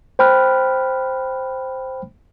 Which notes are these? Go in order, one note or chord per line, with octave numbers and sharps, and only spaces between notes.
C5 G5 B5 F6 F#6